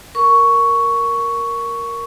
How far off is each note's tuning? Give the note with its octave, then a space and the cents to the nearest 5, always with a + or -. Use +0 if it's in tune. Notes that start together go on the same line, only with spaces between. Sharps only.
A#4 +0 C#6 +5